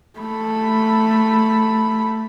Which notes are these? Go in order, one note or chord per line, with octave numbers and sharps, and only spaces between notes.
A3 B5